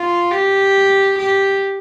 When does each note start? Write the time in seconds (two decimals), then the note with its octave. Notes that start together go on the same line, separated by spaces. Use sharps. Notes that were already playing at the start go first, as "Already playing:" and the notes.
Already playing: F4
0.31 G4
1.18 G4